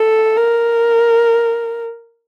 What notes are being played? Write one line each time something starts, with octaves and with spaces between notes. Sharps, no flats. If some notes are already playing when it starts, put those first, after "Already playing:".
Already playing: A4
A#4